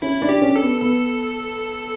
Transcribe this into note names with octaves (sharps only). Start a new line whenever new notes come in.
C#4 E4
D4
G4
C#4
A4
B3
B3 A4